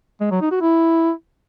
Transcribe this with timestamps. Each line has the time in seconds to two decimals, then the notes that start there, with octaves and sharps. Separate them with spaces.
0.21 G#3
0.31 F#3
0.41 D#4
0.51 F#4
0.61 E4